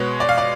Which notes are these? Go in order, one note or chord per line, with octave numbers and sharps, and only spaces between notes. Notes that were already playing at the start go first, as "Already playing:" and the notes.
Already playing: B2 G#3 B3 C#5
D5
F5
D5